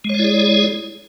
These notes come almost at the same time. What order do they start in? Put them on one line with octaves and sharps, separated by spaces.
G#3 C#5 D5 E4 G#4